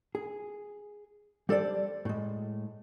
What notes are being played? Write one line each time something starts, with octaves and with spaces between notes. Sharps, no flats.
G#4
G3 A4 C5 D5
A2 G#3